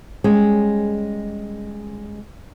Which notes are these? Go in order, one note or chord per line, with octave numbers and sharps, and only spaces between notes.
G3 G#3 C#4 G#4